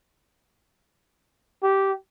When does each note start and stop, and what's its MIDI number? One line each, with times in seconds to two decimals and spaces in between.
1.63 1.92 67